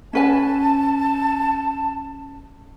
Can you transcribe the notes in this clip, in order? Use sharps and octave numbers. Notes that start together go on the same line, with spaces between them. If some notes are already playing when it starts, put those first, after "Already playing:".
C#4 B4 G#5 A5